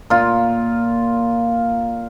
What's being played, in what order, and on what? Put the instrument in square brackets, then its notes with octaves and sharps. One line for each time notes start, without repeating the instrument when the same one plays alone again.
[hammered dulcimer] A#2 F4